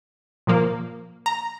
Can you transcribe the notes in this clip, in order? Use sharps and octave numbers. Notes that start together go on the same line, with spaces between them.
A#2 F3 A#3
A#5